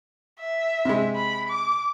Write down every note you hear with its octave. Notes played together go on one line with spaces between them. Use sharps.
E5
C3 G#3
B5
D6